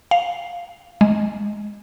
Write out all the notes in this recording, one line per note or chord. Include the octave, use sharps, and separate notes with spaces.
F5
G#3